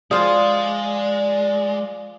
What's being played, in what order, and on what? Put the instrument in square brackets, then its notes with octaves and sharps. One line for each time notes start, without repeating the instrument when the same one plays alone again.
[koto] F3 F4 [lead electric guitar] G#3 [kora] G#4 [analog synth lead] D5